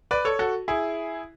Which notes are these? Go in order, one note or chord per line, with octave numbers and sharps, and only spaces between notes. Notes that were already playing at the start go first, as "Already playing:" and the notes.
B4 D5
A4 C#5
F#4 A4
E4 G#4